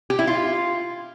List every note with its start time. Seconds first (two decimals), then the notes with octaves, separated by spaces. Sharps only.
0.10 G4
0.19 E4
0.27 F4